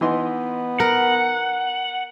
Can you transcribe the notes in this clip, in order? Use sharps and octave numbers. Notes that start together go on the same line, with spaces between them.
E3 B3 D#4 C6
A#4 F#5